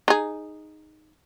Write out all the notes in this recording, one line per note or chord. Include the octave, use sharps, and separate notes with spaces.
D#4 G#4